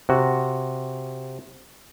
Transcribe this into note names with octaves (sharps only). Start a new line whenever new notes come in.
C3 F#4